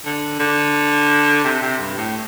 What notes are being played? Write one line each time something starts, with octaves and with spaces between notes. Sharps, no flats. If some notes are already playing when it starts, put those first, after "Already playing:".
D3
D3
C3
C3
G2
A2